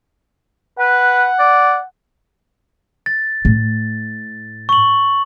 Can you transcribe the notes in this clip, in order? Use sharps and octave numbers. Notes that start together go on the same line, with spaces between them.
B4 F#5
D5
A6
A2
C#6 F#7